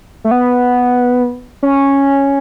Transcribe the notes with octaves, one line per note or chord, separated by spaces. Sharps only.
A3
B3
C#4